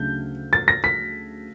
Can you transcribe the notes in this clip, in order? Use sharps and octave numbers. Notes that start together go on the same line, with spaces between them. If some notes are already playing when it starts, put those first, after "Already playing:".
Already playing: D2 C#3 F#3 A3 D4 G6
A6
A#6
B6